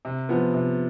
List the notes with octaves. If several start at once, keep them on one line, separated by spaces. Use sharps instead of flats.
C3
F3 B3
C3